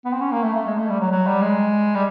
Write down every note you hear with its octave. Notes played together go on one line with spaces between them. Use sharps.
B3
C4
C#4
A#3
A3
A3
G#3
A3
G3
F#3
F#3
G3
G#3
G3